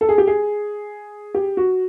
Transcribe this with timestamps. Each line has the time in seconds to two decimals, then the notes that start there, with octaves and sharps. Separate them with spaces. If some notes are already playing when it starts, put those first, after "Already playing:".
0.01 A4
0.09 G#4
0.18 G4
0.27 G#4
1.34 G4
1.57 F#4